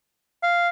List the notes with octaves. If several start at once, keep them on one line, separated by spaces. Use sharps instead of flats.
F5